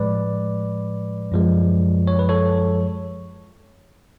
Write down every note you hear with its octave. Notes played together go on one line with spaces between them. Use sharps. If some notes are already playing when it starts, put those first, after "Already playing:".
Already playing: A2 F3 G#3 B4 D5
F#2 F3 G#3
C#5
B4
A4 C#5